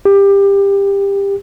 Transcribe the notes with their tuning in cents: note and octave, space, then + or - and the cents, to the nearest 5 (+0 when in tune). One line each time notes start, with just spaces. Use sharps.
G4 +20